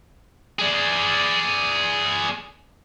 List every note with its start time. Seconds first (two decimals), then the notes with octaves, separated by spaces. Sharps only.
0.59 G#4 D5